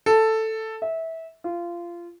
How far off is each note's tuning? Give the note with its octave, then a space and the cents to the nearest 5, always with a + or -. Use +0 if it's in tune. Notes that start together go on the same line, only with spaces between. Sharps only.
A4 +5
E5 -20
F4 -20